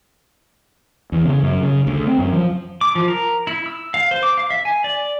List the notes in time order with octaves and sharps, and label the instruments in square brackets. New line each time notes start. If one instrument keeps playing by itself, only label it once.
[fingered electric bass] E2
C#3
F#2
C#3
D2
C4
F#2
F3
[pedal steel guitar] D6
F3
A#4
E4
E6
F5
C5
D6
F5
E5
G#5
D5